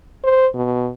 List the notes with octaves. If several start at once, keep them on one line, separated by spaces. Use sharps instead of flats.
C5
B2